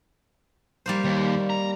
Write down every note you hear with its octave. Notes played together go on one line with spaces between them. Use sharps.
G3 A#3 C5
D#2
A#5